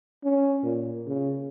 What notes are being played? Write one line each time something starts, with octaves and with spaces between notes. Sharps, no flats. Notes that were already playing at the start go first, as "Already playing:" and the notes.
C#4
A#2
C#3